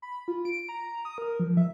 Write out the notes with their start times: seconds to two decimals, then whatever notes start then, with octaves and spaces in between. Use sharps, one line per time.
0.02 B5
0.28 F4
0.45 D7
0.69 A#5
1.05 D#6
1.18 A#4
1.40 F3
1.57 E5